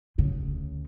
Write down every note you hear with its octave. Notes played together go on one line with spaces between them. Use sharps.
D2 C#3